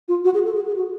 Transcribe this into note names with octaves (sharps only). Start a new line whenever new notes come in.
F4
F#4
G#4
A4
G#4
G#4
F#4